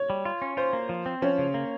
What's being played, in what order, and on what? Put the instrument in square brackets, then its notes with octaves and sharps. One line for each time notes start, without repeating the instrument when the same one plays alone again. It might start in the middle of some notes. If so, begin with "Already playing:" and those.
Already playing: [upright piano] C#5
[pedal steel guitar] G3
F4
C#4
[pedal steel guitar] F4 [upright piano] C5
[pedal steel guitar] A#3
F3
C4
[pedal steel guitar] F3 [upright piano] C#4
[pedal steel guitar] C#3
A#3